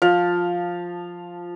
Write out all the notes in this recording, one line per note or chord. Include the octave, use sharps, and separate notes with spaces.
F3 F5